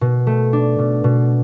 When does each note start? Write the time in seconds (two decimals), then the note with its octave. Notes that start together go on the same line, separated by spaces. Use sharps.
0.01 B2
0.27 A3
0.53 D4
0.79 B2
1.04 B2